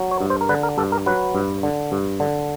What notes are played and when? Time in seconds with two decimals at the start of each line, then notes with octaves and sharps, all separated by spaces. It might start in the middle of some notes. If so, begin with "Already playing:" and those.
Already playing: F#3
0.11 C#5
0.21 G2
0.30 C5
0.41 A#4
0.49 D3 B4
0.63 A#4
0.78 G2 A4
0.92 A#4
1.06 F#3 B4
1.35 G2
1.63 D3
1.92 G2
2.20 D3